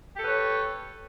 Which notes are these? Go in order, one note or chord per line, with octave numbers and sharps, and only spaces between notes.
G4 A4 B4 C#5